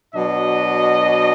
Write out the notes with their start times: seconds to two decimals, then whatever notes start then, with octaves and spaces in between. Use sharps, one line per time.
0.15 B2 F#3 D4 D#5